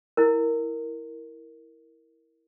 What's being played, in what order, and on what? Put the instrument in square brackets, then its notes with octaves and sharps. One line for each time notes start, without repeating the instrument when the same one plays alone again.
[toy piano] E4 A#4